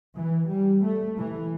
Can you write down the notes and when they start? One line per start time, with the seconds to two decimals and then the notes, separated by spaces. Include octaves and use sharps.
0.15 E3
0.48 G3
0.84 A3
1.19 E3